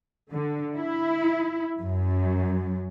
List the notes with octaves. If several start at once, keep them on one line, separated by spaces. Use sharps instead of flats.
D3
E4
F#2